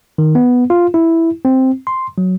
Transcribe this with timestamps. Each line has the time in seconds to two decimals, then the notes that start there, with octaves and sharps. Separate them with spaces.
0.18 D#3
0.35 B3
0.70 F4
0.94 E4
1.45 C4
1.87 C6
2.18 F#3